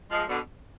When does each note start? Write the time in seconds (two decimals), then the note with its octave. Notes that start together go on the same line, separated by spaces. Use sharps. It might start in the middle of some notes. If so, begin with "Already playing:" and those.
0.10 F3 G#3
0.27 B2 D3